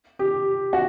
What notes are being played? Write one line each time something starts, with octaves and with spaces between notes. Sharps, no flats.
G4
F#4